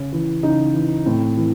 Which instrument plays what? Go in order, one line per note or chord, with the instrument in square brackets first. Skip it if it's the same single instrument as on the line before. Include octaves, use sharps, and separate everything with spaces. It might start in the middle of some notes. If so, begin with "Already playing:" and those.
Already playing: [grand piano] C#3 C#4
E3
C#3 D#4
E3
A2 C4
E3